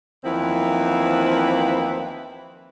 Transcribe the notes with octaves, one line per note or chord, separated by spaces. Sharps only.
D#2 E3 F3 B3 C4 E4